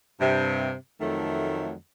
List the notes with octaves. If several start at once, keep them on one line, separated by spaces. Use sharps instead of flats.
G2 C3
F2 D#3 F#3 A3